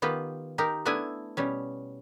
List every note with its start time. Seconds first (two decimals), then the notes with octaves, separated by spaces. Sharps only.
0.02 D#3 B3 F4 G4
0.58 D#4 G4 A#4
0.85 A3 B3 D4 E4 G#5
1.37 B2 G3 C#4